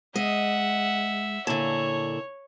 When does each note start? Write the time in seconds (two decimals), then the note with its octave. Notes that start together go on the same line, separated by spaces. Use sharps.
0.16 G#3 D#5 E5 F#5
1.47 A#2 D3 E4 C#5 A5